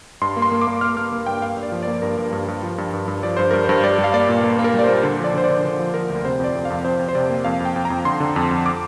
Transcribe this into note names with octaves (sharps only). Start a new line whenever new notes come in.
G2 C6
A#3
C6
A#3
D6
A#3
A#3 F6
A#3 F6
A#3
G2 G5
A#3 F5
G2
D5
F3
A#3 D5
G2 A#4
G2
G2
G2
F3
G2
G2
G2
F3 D5
G2 C5
G2 A#4
G2 C5
G3 D5
G3
F5
A#3 D5
A#2
A#3
A#3
A#4
G3 D5
C5
A#2
D3
F3 D5
D3 C5
D5
D3
D3 C5
F3
F3 A#4
D2
C3 C5
F2 D5
F2
F5
F2
F2 C5
F2
C5
C3 D5
A#3
F2 F5
F2
G5
F2
A#5
F2
D3 C6
D3
F2
F2
D6